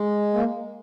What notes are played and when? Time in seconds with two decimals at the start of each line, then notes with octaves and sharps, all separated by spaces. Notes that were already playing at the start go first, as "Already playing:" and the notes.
Already playing: G#3
0.34 A#3